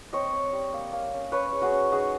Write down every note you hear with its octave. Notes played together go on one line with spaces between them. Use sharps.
C4 C#5 D#5
C4
G3
A#3
A#3
C#4
C#4 B4 C#5
G#3
F#4 G#4
C#4
D#4 F#4 G#4